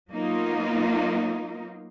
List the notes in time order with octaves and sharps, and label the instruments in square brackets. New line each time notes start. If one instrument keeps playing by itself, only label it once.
[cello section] F#3 A#3 B3 D#4 F4